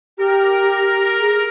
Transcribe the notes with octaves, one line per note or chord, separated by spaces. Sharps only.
G4 A#4
G#4